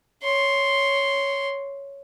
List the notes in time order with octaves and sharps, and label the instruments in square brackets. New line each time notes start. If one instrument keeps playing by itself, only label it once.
[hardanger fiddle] C#5 C6